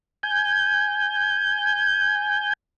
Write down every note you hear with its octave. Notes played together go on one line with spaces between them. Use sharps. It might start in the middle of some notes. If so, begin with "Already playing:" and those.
G#5 G6